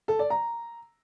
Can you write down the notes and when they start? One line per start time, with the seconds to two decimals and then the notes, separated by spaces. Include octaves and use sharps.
0.08 A4
0.19 D5
0.30 A#5